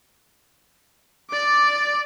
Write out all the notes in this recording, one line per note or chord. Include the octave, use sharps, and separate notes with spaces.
D5 D6